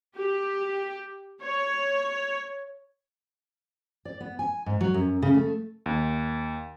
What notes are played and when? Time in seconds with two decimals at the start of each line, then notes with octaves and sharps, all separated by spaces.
0.16 G4
1.43 C#5
4.05 D5
4.20 B3
4.39 G#5
4.66 G#2
4.81 F#3
4.94 F#2
5.22 C#3
5.34 A3
5.86 D#2